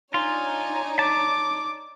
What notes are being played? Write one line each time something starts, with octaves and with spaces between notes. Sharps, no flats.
D4 D#4 F4 C#5 G#5
A5 D6